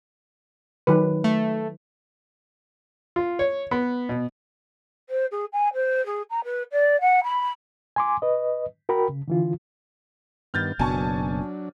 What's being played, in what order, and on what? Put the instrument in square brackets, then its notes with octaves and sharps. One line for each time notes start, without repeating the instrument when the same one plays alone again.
[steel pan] D#3 F#3 B4
[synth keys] A3
[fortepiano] F4
C#5
B3
B2
[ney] C5
G#4
G#5
C5
G#4
A#5
B4
D5
F#5
B5
[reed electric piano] G#5 C6 D6
B4 D#5
F#4 A#4 G5 B5
C#3
D3 E3 F4
[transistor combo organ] G2 D#3 B3 [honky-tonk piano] F6 G6 A6
[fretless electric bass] F#1 B2 [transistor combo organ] F#3 D4 [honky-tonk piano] G#5 A5 C#6